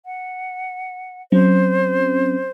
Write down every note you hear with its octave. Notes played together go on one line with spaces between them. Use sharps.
F#5
F#3 C4 C#4 C5